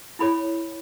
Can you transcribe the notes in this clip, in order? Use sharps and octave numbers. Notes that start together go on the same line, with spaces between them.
E4 A4 C#5 B5